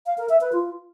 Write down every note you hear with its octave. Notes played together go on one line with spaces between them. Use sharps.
F5
A#4
E5
B4
F4